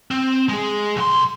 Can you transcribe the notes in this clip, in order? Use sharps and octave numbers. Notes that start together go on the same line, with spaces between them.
C4
G#3 G#4
B1 C6